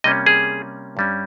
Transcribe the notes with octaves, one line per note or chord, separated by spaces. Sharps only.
C3 G3 A#3 C#4 D#5
G#4
G2 G3 C#4